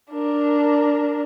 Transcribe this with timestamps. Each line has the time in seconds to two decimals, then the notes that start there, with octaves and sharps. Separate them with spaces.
0.11 D4 A#4